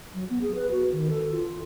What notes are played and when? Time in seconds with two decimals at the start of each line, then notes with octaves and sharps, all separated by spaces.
0.14 F#3
0.30 B3
0.42 G#4
0.55 B4
0.71 F#4
0.92 D#3
1.10 A4
1.32 F4